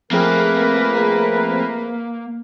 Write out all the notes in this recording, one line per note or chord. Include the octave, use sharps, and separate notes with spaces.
F3 A3 A#3 C4 G#4 A#4 B4